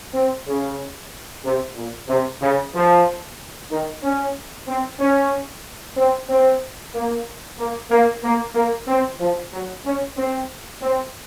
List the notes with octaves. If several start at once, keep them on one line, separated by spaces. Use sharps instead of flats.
C4
C#3
C3
A#2
C3
C#3
F3
D#3
C#4
C4
C#4
C4
C4
A#3
A#3
A#3
A#3
A#3
C4
F3
F#3
C#4
C4
C4